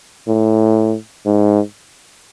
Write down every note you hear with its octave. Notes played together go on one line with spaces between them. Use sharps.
A2
G#2